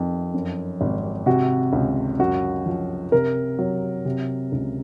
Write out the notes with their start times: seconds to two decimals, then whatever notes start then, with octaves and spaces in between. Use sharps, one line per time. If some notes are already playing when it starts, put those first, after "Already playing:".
Already playing: F2 D#3
0.34 F#2
0.81 G#1
1.26 C3 F#4
1.73 C#2
2.19 F#2 F#4
2.66 F3
3.12 C3 A#4
3.59 F#3
4.05 C3
4.52 C#2